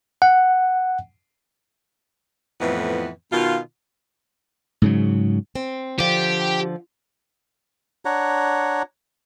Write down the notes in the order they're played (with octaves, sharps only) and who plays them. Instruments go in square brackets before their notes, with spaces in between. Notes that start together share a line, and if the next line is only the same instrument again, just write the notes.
[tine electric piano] F#5
[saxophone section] F2 A2 E3 B3 C4
B2 D#3 F4
[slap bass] G#2 C#3 F#3
[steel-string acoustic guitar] C4
[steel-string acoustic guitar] D3 F3 [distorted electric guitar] G4
[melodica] D4 C#5 F#5 A#5